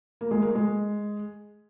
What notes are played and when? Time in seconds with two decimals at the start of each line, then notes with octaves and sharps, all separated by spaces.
0.21 A#3
0.31 G#3
0.42 A#3
0.55 G#3